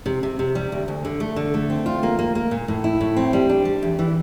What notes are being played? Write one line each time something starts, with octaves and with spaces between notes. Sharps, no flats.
C3
C3
C3
G3
D2
D2
D3
A3
D3
A3
C4
F4
A#3
A#3
A#3
A#2
A2
E4
A2
C4
G3
D4
G3
E2
E3